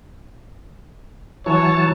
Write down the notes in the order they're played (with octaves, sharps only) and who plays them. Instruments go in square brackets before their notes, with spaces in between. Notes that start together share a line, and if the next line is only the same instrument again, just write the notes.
[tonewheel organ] E3 F#3 A5 [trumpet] C#5